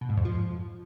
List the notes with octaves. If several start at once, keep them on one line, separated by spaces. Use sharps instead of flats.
B2
G#2
F2
F3